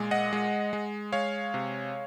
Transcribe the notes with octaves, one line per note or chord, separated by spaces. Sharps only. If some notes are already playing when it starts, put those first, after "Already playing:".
Already playing: A#2 G#3
D#5 F#5
G#3
G#3
G#3 C#5 F5
C3